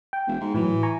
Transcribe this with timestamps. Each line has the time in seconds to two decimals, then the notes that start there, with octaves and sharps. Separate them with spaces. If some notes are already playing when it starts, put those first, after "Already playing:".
0.13 G5
0.27 E1
0.40 G#2
0.54 A2 E3 F#3
0.83 G#5 A#5 C#6